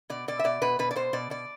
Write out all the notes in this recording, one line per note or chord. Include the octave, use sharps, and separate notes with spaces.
B2 D5
B2 D5
E5
B2 D5
B2 B4
B2 B4
D5
B2 C5
B2 D5
B2 D5